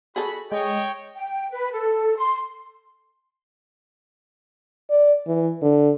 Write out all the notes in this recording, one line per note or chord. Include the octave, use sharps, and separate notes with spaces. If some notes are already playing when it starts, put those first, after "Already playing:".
F#4 G#4 A4 B5
G#3 C#5 D#5 G5
G5
B4
A4
C6
D5
E3
D3